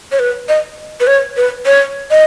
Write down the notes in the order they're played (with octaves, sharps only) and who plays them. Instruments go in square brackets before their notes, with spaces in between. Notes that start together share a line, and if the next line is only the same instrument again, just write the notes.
[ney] C#5
B4
D#5
B4
C#5
B4
C#5
D#5